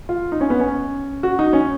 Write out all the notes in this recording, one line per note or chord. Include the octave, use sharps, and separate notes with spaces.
F4
D#4
C#4
B3
C#4
F#4
D#4
C#4